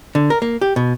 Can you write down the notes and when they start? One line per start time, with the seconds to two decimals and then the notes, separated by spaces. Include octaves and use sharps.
0.15 D3
0.30 A#4
0.42 A#3
0.62 G4
0.76 B2